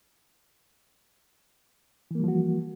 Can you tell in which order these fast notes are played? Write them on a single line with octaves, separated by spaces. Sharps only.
E3 A#3 G3 F3 F#4